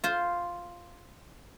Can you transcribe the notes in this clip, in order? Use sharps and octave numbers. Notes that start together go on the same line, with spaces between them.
F4 C5